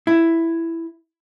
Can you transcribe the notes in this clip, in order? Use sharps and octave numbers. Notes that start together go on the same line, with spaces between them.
E4